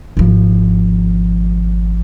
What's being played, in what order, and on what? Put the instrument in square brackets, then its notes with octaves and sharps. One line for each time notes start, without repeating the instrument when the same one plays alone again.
[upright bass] G#1 F3